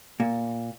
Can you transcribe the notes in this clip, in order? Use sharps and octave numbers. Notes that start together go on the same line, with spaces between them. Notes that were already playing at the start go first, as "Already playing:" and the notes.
A#2